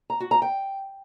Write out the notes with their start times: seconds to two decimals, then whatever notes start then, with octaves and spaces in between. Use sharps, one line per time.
0.10 A#5
0.20 F#4
0.31 A#5
0.42 G5